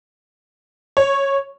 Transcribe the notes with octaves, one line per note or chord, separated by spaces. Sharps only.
C#5